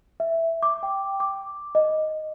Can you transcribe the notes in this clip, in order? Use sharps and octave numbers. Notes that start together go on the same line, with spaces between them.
E5
D6
G5
D6
D#5